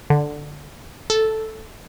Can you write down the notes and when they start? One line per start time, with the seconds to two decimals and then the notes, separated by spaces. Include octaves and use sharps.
0.10 D3
1.10 A4